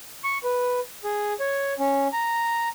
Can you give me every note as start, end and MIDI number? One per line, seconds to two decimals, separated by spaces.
0.24 0.38 85
0.44 0.80 71
1.04 1.33 68
1.40 1.73 73
1.79 2.08 61
2.13 2.69 82